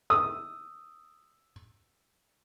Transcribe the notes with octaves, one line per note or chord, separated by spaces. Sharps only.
D#6 E6